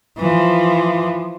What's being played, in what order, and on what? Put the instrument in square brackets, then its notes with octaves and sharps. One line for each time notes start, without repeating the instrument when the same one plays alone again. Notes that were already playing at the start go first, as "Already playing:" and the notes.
[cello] E3 F3